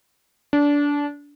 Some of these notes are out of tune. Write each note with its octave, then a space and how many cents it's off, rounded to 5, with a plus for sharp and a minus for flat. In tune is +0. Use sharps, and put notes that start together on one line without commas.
D4 -20